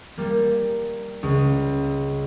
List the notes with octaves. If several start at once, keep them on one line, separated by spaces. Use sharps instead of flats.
G3 A#3
C#2